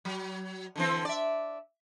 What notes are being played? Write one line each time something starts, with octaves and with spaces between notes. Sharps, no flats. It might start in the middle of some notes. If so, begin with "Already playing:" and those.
F#3
D3 E3 C4
D5 E5